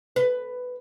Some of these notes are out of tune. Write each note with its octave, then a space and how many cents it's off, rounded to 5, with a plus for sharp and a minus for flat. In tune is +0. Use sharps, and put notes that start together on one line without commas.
B4 +10